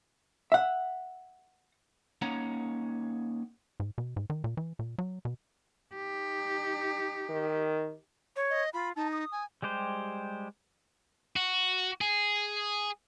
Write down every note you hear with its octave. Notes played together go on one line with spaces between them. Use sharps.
E5 F#5
A#3 C#4 D#4 C#5 F#5 A#5
G#2
B2
G#2
D#3
A#2
E3
A#2
F#3
B2
D#4 G4
D#3
C#5
D#5
F4 B5
D#4 A5
D#6
G#5
G3 G#3 G4 C5
F#4
G#4